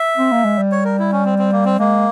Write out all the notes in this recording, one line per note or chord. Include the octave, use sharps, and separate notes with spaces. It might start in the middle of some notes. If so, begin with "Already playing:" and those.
Already playing: E5
C4
A#3
G#3
G3
C#5
A#4
E4
C#4
C4
C4
A#3
C4
G#3 A#3